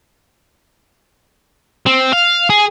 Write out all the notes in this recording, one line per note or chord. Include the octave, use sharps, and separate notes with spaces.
C4
F5
G#4